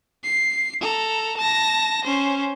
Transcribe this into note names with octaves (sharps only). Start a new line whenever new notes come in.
C7
A4 A#5
A5 A#6
C#4 C5